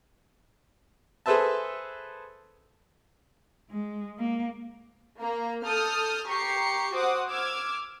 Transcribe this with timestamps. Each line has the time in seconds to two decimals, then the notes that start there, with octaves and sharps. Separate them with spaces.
1.26 G#4 A4 B4 C5 E5 A5
3.70 G#3
4.18 A#3
5.17 A#3 A#5
5.64 A4 D#6 F6 G6
6.27 G4 A#5 C#6 C7 C#7
6.93 F#4 C5 F#5 D6 D#6
7.29 D6 E6 F6 G#6